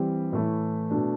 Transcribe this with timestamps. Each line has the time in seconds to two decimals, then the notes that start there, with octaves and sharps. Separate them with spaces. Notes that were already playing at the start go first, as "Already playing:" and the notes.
Already playing: E3 G3 C4 G4
0.32 A2 E3 A3 E4
0.90 B2 A3 D4